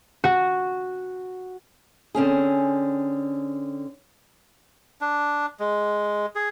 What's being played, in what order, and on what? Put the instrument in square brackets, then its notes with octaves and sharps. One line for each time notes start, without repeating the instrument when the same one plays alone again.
[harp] F#4
[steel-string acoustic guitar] D3 C4 C#4 G#4
[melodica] D4
G#3
G#4